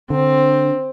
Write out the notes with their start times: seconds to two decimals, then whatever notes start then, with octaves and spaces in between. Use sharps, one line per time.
0.10 D3 C4 D4